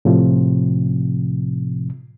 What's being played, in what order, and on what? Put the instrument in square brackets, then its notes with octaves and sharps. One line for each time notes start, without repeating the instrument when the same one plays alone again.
[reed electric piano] A2 C3 F3